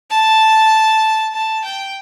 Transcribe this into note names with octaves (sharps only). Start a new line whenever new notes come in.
A5
A5
G5